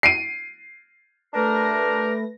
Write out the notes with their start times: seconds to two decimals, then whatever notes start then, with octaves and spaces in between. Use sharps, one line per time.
0.03 C7 D7 D#7
1.34 A3 D4 G4 A#4 B4 A#6